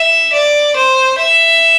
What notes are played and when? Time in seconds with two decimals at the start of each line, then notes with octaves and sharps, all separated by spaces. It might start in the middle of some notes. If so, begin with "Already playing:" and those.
Already playing: E5
0.33 D5
0.76 C5
1.18 E5